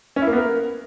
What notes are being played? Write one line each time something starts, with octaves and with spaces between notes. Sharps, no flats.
C#4
E4
A#3
B3
A#4